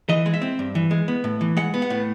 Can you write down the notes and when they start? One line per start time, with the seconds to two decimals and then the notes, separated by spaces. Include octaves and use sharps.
0.09 E3 D#5
0.26 G#3
0.34 E5
0.42 C4
0.59 G2
0.75 E3
0.91 G#3
1.08 B3
1.24 A2
1.41 E3
1.57 G#3 F#5
1.74 B3
1.82 F#5
1.90 A2